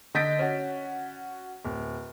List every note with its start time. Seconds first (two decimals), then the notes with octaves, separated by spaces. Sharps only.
0.15 D3 D#5 G6 A6 B6 D7
0.39 C#4 F#4
1.65 D1